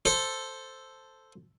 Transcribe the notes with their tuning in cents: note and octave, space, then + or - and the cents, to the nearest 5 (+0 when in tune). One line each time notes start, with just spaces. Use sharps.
A4 +0 C5 +0